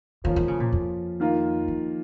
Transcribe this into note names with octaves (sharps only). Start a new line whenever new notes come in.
D#3 F3 A#3 C#4 F4
D#3
C#3
A#2
F2
D#3 A#3 F4
F3